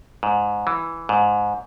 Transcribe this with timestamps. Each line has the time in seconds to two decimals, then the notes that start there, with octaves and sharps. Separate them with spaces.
0.23 G#2
0.67 E3
1.09 G#2